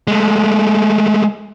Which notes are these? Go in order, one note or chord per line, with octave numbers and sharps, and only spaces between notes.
G#3 A3